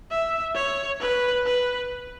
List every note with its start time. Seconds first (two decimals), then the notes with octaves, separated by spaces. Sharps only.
0.11 E5
0.55 C#5
1.00 B4
1.46 B4